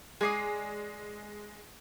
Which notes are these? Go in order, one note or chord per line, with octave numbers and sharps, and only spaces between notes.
G#3 G#4 D5 D#6 C7